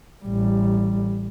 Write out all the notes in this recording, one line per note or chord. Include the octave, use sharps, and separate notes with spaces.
A1 G3